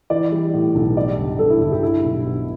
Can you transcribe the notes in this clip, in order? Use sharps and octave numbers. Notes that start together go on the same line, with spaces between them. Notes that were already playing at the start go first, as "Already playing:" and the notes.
E3 D5
G3
A2
B1
G3 D5
G1
G2 A4
E4
G1 E4
G4
G3 E4
B1
B2